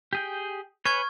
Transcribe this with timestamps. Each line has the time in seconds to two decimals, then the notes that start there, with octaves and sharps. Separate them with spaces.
0.13 G4 G#4 G5
0.85 B4 C#5 G#5 C#6 F6 G#6